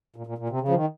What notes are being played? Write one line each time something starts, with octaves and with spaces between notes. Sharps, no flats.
A#2
A#2
A#2
C3
C#3
F3
D#3